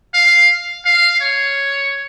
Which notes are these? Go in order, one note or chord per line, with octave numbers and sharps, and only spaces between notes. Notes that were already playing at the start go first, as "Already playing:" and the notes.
F5
F5
C#5